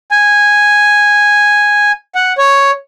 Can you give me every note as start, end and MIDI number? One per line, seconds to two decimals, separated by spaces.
0.11 1.92 80
2.15 2.33 78
2.38 2.71 73